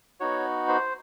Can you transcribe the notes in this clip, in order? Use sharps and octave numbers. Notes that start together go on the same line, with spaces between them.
B3 D#4 F#4 C#5
C5